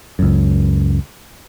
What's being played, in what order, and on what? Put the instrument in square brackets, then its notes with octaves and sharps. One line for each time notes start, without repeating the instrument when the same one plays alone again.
[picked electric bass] C#2 F#2